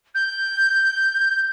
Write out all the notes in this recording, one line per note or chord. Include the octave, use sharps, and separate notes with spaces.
G6